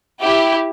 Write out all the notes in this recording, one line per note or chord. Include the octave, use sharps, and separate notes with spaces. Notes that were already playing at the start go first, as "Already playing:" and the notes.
E4 G4